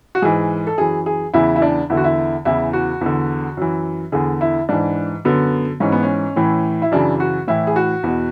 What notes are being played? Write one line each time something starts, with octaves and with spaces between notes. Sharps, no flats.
F#4
G#2 E3 G#4
A4
F#2 E3 G#4
G#4
E2 C#3 E3 E4
E4
D4
E2 D3 E4 F#4
E4
E2 C#3 E3 E4
F#4
E2 D3
F#2 E3
E2 D3 G#4
E4
G#2 E3 D4
F#2 D3 B3
G#2 E3 C#4
B3
C#4
A2 E3
E4
F#2 C#3 E3 D4
F#4
A2 E3 E4
G#4
F#4
E2 B2